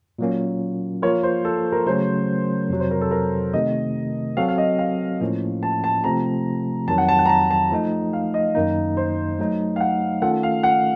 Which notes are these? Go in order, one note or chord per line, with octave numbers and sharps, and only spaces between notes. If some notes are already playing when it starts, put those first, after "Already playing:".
A#2 F#3 A#3 C#4
F3 A#3 F4 A#4 C#5
C5
A4
A#4
C#3 F#3 A3 C#4 C5
F2 C3 F#3
C5
A#4
A4
A#4
C3 D#3 A3 D#5
F#3 C4 F#4 A4 F5
F5
D#5
F5
A2 F3 A#3 C#4
A5
A5
C3 F3 A3 C4 A#5
F2 D#3 F#3 A5
F#5
A5
F#5
A#5
A5
A5
F3 A3 D#4
F5
D#5
F#2 D#3 A#3 D#4
C5
F#3 A3 D#4
F5
F#5
D#3 A3 C#4 F4 A4 F#5
F5
F#5